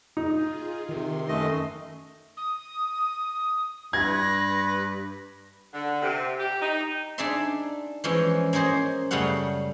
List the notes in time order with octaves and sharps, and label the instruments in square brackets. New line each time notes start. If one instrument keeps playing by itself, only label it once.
[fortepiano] D#4 [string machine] F4 G#4
[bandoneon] C3 [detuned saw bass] D#3 [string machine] C6
[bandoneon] F#2 A3 D#5
[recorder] D#6
[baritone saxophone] G2 [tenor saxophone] B4 [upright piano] G#6 [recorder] A#6
[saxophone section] D3
C3
G4
D#4
[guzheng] D4 D#4 G#4 D5 E5 C6
E3 F3 G#3 C#4
A#3 C#4 G#4 C5 D#5
F#2 C#3 G3 A3 F5 F#5